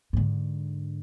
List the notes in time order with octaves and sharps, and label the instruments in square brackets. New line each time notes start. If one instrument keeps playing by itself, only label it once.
[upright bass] G#2 D3